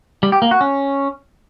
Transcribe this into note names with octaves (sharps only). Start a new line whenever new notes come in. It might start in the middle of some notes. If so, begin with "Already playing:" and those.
G3
G4
A#3
F#4
C#4